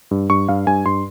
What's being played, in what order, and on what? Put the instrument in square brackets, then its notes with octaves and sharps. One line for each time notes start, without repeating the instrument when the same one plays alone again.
[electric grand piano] G2
G2 C#6
G2 F5
G2 G#5
G2 C6